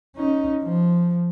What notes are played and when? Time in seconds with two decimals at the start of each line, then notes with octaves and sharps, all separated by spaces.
0.16 C#4 D#4
0.63 F3